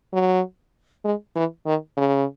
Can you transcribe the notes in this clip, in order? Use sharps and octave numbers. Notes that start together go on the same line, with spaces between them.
F#3
G#3
E3
D#3
C#3